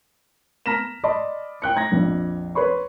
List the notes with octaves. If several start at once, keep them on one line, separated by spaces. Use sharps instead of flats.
A5 A#5 F6 A#6 B6 E7
D5 D#5 A5 B5 C6
G5 F#6 C#7
A#5 G#6 A#6
A#1 F2
B4 C#5 C6 C#6